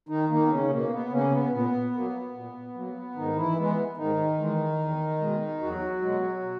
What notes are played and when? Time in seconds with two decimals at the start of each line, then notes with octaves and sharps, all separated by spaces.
0.09 D#3 D#4
0.29 D#3 A#3 D#4
0.46 B3
0.50 C#3 C#4
0.70 B2 A#3
0.91 B3
1.11 C#3 A#3 C#4
1.32 B3
1.52 A#2 B3
1.93 F#3 A#3
2.34 A#2
2.75 F#3 A#3
3.15 G#2 D#3 D#4
3.36 E3 E4
3.56 E3 G#3 B3
3.97 G#2 D#3 D#4
4.38 E3 G#3
4.79 E2
5.20 B2 G#3
5.61 E2 F#3 F#4
6.02 B2 G#3
6.43 B2